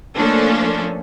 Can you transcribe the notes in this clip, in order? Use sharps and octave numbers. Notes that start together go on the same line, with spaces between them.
F3 A3 A#3 C#4 D4 A4